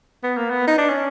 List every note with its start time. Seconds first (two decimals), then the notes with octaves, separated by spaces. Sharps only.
0.23 B3
0.37 A#3
0.50 B3
0.67 D#4
0.78 D4
0.89 C#4